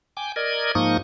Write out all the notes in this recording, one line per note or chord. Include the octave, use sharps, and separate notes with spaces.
G5 G#5 D6
A#4 D5 D#5 G#6
G#2 F3 A#3 D#4 C#6 D#6